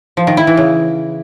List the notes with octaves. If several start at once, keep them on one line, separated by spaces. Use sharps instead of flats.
F3
D#3
E4
E3
C#3